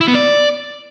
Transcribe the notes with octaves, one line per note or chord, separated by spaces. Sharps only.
E4
B3
D5